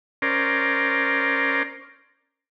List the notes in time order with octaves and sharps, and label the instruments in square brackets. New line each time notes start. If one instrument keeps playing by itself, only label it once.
[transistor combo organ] C#4 A#4 C5 D5